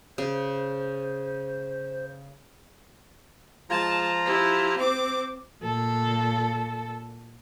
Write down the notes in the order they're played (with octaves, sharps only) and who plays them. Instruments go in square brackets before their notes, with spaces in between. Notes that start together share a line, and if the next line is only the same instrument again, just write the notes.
[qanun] C#3 [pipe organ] C5
[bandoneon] F3 F4 A#5 [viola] G#3 A5
[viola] E4 G4
C4 D6
[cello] A#2 A4